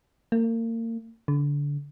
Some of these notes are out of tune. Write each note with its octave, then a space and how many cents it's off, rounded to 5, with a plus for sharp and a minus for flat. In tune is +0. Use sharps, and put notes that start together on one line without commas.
A#3 -35
D3 -25